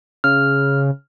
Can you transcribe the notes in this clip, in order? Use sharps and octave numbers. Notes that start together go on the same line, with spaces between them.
C#3 F6